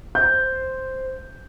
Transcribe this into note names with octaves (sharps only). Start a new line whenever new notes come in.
C5 G6
C5
C5